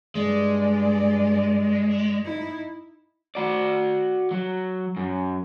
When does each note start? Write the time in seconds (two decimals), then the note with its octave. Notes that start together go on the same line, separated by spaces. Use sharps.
0.15 G2 G#3 D5
2.25 D#4 E4
3.35 F#4 D5
4.31 F#3
4.97 F#2